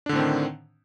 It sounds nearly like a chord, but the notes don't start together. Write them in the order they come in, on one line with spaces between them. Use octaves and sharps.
D4 D3 A2 C4 D#3